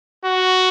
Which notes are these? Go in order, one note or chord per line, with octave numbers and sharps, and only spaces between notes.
F#4